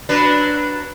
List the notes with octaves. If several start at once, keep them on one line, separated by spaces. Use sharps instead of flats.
F#3 D4 B4